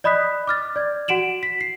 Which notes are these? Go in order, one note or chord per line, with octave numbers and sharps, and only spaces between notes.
D5 D#5 B5 D#6 F#6 B6
D6 F6 A6
D5 G#6
F#4 F#5 D7 E7 F#7
B6
C7